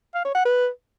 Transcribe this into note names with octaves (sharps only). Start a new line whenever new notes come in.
F5
C#5
F#5
B4